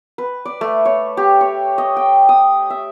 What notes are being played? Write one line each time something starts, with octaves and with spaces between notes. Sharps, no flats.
B4
D5
A3
C#5
G4
C#5
D#5
G5
D#6
E5